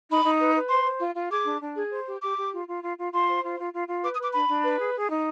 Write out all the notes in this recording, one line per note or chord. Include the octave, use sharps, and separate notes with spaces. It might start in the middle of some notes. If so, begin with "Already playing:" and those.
D#4 B5
D#4
B4
B4
C5 C6
C5
F4
F4
G#4 D6
D4
D4
G#4
C5
G4
G4 D6
G4
F4
F4
F4
F4
F4 C6
C5
F4
F4
F4
F4
B4 D6
D#6
B4
D6
D4 B5
D4
B4
G#4
G#4
D#4